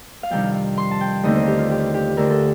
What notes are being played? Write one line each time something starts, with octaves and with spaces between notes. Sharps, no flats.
F5
F2 C3 D#3 G3 D4 G5
F5
C6
A5
G5
D#2 D3 A3 C4 D#4 D#5
C5
G4
F4
G4
G4
D2 D3 A3 D4 A#4
A4